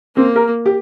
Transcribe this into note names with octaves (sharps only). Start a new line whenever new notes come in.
A#3 C4
A#4
G4